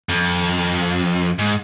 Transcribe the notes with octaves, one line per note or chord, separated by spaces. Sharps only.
F2
G#2